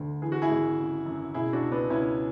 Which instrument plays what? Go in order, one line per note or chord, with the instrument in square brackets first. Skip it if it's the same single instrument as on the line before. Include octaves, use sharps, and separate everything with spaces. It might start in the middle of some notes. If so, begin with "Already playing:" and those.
Already playing: [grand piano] D2 D3
E3 G#4
F#4
E4 G#4
G#1
C#3
F#2
B2 E4 G#4
D4 F#4
C#2
B3 D4
C#2 C#4 E4